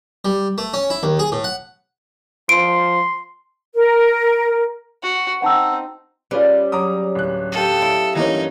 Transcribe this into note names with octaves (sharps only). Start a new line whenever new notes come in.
G3
A3
C#4
E4
D#2
G#4
A2
F#5
F3 C6 D7
A#4
F#4
C4 D#4 F#5 A5 E6
G3 C#4 F4 G#4 B4
F#3 A#5 D6 D#6
D1 F#6
G4 A4 F5 D#6
E4
G2 E3 A#3 C#4 D#4